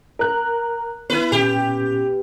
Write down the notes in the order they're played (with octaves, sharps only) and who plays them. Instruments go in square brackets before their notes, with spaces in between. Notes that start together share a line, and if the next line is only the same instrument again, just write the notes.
[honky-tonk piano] A#4 F#6
[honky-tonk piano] B3 [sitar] E4 B4
[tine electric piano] A#2 C#4 [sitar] G4